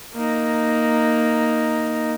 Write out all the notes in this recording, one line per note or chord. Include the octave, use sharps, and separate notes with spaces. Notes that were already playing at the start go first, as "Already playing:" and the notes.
A#3 D#4